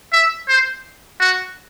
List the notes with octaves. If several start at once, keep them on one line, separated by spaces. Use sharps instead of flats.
E5
C5
F#4